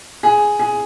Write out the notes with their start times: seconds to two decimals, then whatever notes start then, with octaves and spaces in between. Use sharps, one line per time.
0.23 G#4
0.59 G#4